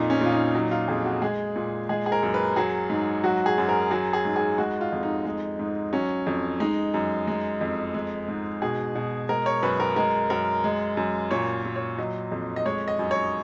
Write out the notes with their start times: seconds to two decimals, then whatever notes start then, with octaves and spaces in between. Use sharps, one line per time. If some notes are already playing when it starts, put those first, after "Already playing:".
Already playing: F2 A#2 D#4
0.10 C#4
0.21 A#2 F4
0.32 D#4
0.55 F#3 D#4
0.71 F4
0.88 F2 G#4
1.05 F#4
1.22 G#3 G#4
1.56 A#2
1.89 G#3 G#4
2.06 G#4
2.12 A#4
2.23 F#2
2.34 B4
2.56 F#3 G#4
2.90 G#2
3.24 F#3 F#4
3.46 G#4
3.58 F#2
3.69 A#4
3.91 F#3 G#4
4.13 G#4
4.25 G#2
4.36 G#4
4.58 G#3 F#4
4.81 F4
4.92 F2
5.03 D#4
5.25 G#3
5.59 G#2
5.93 F#3 C#4
6.27 F2
6.60 G#3 D#4
6.94 F#2
7.27 G#3
7.61 F2
7.94 G#3
8.28 G#2
8.62 B2 G#4
8.95 B2
9.29 G#3 A#4
9.46 C#5
9.63 F#2 B4
9.80 A#4
9.96 G#3 A#4
10.30 F#2 A#4
10.64 G#3
10.97 F#2
11.31 A#2 C#5
11.65 A#2
11.76 C#5
11.98 F#3 D#5
12.32 F2
12.56 D#5
12.65 G#3 C#5
12.88 D#5
12.99 F#2
13.11 C#5